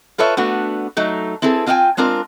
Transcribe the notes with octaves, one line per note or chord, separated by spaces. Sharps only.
F4 A4 B4 C#5 E5
A3 B3 D4 F#4
F#3 A3 D#4
C4 E4 G#4 A4 B4
C4 F4 D#5 F5 G5 G#5
G#3 C4 D4 F4 A#4